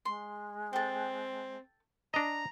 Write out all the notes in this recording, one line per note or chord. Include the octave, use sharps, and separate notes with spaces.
G#3 C6
C4 A4 G5
D4 D#5 A#5